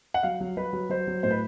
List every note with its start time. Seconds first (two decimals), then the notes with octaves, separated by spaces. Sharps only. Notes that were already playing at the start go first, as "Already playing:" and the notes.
0.14 F#5
0.23 F#3 F5
0.40 F#3
0.57 F#3 B4
0.73 F#3
0.90 F#3 C5
1.07 F#3
1.23 A2 C5
1.31 B4